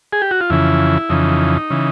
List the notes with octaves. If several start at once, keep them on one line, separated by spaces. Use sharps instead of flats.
G#4
G4
F#4
F4
F2 C#3 E3 E4
F2 C#3 E3 D#4
C#3 E3